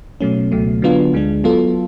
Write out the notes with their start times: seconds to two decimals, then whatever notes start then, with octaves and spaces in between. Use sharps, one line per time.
0.21 B2 F#3 A3 C#4
0.52 C#2 B2 F#3 A3
0.82 D3 F#3 B3 D4 F4
1.13 D2 D3 G#3 D4
1.44 F#3 B3 F4 A4